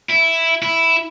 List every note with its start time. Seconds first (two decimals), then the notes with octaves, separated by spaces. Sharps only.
0.10 E4
0.62 E4